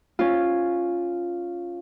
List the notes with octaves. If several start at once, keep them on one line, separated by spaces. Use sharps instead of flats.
C#4 F4